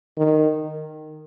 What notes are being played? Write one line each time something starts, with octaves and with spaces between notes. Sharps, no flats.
D#3